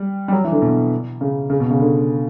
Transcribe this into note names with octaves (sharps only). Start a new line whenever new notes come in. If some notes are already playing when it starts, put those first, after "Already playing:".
Already playing: G3
G3
F#3
E3
D3
B2
C#3
C#3
B2
C#3
D3